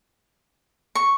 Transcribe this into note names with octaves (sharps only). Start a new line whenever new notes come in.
C#6